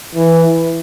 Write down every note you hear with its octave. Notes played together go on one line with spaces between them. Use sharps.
E3